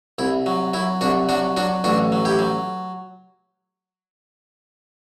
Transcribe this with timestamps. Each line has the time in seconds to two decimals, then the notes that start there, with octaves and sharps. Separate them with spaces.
0.18 C2 E4
0.46 F#3
0.74 F#3 E4
1.01 C2 D4 F#4
1.29 F#3 D4 F#4
1.57 F#3 D4 F#4
1.84 A1 D4 F#4
2.12 F#3
2.25 E4 G4
2.39 F#3